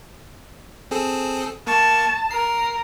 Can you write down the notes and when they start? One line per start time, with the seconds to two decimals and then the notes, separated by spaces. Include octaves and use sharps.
0.91 C4 G#4 A4
1.67 A#3 A5 C#6
2.31 A#4 C7